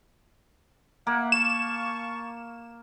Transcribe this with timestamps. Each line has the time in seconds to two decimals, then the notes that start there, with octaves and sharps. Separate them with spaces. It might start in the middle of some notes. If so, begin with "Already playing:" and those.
1.07 A#3 E5 F#5
1.32 F5 A5 C#6 E7